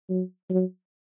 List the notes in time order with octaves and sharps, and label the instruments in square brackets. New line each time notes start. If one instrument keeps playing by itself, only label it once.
[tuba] F#3
F#3